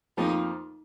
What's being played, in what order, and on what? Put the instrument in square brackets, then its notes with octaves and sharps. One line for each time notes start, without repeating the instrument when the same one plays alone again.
[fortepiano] F2 F3 A#3 F4 A#4 [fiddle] D#4